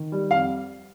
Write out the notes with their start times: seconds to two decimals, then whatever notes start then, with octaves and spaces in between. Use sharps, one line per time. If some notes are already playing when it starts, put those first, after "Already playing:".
Already playing: D#3
0.12 G3
0.30 F2 F5